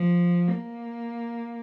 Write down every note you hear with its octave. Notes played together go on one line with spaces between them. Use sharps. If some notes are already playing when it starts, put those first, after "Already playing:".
Already playing: F3
A#3